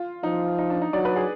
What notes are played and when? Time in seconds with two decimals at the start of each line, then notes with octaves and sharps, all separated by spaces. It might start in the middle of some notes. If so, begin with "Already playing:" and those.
Already playing: F4
0.23 F3 D#4
0.58 D#4
0.70 D4
0.82 D#4
0.93 F#3 D5
1.05 B4
1.16 G#4